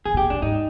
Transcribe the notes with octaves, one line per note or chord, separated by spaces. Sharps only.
D3 G#4
B2
G4
A#2
A2 D4
G#2 D#4